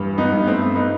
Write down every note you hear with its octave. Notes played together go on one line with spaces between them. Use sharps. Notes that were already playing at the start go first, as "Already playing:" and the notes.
Already playing: E2 G2
B3 D#4
G2
A3 C4
B3 D#4